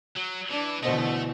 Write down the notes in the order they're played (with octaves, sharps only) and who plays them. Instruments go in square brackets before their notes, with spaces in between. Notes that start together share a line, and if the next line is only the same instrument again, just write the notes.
[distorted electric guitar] F#3
[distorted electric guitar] E3 [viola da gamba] D4
[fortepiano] D2 C5 D#5 [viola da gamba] B2 E3 [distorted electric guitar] A3